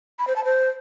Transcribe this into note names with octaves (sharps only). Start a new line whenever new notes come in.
B5
C5
A5
C5